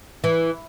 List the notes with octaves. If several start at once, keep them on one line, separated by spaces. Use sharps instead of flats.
E3